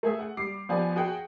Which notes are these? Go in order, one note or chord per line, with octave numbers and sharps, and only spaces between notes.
A3 G#4 E5
F#5
G3 D6 C7
F3 B3 G4 D5 G#5
F#4 G#4 F#5 G5